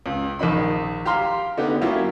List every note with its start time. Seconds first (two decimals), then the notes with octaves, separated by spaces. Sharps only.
0.06 C#2
0.39 A#1 D#3 D#4 B5
1.05 G4 F5 A#5 C6 F6
1.57 D3 B3 D#4 G4
1.81 F#3 A#3 C#4 E4 F4 G4